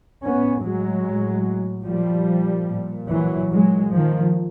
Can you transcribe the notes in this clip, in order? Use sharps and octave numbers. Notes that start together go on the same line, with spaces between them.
A2 B3 C#4
F#3 G#3
A2
A#2 F3 G3
A#2
E3 F#3
A#2 F#3 G#3
D#3 F3